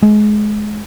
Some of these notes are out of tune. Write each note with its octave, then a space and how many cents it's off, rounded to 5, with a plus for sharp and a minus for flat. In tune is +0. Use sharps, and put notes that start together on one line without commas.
G#3 +25